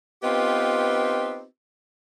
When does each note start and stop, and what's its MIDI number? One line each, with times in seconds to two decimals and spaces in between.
0.23 1.44 59
0.23 1.44 60
0.23 1.44 63
0.23 1.44 65
0.23 1.44 67
0.23 1.44 71